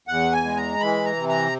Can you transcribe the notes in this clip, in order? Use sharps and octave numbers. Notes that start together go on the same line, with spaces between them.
E2 F#5
G#5
G#3
A#5
E3 B5
A#5
C3
A#5